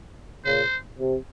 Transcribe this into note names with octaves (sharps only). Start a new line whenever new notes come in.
A#2 C#3 C5
C3